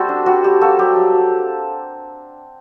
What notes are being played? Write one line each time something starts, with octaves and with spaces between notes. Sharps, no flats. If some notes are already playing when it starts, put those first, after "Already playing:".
Already playing: G3 A3 C4 F#4 A4 C5
D4
G3 F#4
G3 G4
A#3 F#4 A4
F#3 G4
F#3
F#3